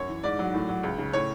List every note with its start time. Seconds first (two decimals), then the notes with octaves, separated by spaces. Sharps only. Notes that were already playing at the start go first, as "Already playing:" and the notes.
Already playing: F#2 C#5
0.08 E3
0.24 G#2 D5
0.39 F#3
0.54 A2
0.69 F#3
0.83 C#2
0.98 C#3
1.13 A2 C#5